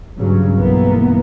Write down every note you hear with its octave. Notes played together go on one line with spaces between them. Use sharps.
G2 C#3 F#3
B1 G2 E3 A#3 B3